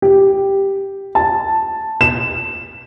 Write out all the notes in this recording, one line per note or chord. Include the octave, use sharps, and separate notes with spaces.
G4
A5
E7